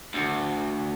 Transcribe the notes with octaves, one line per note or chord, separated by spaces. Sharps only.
D2